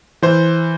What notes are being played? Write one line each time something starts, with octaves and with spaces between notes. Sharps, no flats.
E3 C5